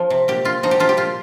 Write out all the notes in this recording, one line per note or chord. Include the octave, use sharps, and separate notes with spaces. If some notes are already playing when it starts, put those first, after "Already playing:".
Already playing: F3
C3
A#2 G4
A#2 F4
F3 D#4
G4
F3 F4
G4
A#2 F4